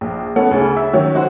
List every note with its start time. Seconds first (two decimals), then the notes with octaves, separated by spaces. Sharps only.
0.01 A#1
0.36 B3 C#4 D#4 A4 F#5
0.51 D2 C#3
0.77 E5 E6
0.93 D#3 F#3 C#4
1.15 D#4 F#4 C5 F#5